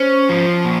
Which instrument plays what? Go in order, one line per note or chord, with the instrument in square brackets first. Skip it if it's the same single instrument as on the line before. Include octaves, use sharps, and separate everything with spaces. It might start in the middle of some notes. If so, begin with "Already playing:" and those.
Already playing: [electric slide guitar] C#4 [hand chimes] C5
[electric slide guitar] F3
A#2